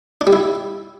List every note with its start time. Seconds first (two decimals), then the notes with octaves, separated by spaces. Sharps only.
0.21 D4
0.27 G3
0.33 E4